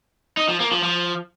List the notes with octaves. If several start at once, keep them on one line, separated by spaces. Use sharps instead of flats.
D#4
F3
A#3
F3
F3